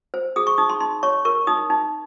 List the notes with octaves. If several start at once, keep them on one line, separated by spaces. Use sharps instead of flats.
C5
G#4 D#6
C#6
D#4 D#6
C6
D#4 C6
C#5 C#6
A#4 C#6
D#4 D#6
D#4